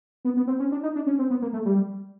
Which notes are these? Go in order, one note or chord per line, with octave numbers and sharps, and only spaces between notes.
B3
B3
C4
C#4
D4
D#4
D4
C#4
C4
B3
A#3
A3
G3